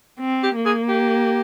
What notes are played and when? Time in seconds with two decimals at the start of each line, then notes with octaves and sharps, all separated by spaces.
0.20 C4
0.43 G4
0.56 A#3
0.66 G#4
0.89 G4